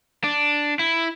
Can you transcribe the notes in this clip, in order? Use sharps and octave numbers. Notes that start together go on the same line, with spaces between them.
D4
E4